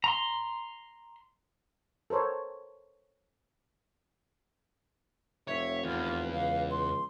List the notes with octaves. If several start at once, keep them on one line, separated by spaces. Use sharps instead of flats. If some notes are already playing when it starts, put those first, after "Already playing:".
A#5 C6
A4 A#4 C5 C#5
F1 C#5 E5
E2 F4
C#2 F5
C6